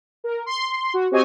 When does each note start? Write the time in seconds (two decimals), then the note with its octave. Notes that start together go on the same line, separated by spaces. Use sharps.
0.24 A#4
0.46 C6
0.94 F#4
1.11 C4 F#4 G4 C#5 D#5 G#5